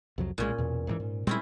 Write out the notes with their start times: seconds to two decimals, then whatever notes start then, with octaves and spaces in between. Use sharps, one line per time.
0.18 C2 F2 F#3
0.38 B1 A#2 G#3 C#4
0.58 E2 B2
0.87 G#2 C#3 E3
1.00 G#2
1.27 A#2 G3 G#3 C4 C#4 E4